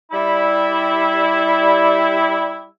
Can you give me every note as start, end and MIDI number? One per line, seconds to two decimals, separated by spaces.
0.12 2.63 55
0.12 2.63 64